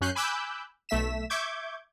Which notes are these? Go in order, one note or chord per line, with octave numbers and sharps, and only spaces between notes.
F#2 C#4 F#6 G6 C7
G#5 B5 D6 E6 F#6 G6
B1 A3 E5 B6 E7
E5 C#6 D6 G6 G#6